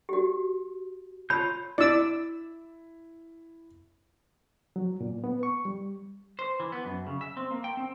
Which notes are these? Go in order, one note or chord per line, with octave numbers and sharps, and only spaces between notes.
F#4 G4
F4 C#5 A5 B5 E6 G6
E4 D5 E6
F#3
A#2
B3
C#6
G3
C5
E3
B3
F#2
C#3
E5
C4
A#3
G5
C4